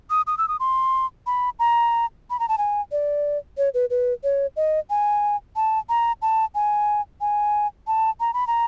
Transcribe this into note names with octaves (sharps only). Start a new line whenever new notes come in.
D#6
D#6
E6
D#6
C6
B5
A#5
B5
A#5
A5
G#5
D5
C#5
B4
B4
C#5
D#5
G#5
A5
A#5
A5
G#5
G#5
A5
A#5
B5
A#5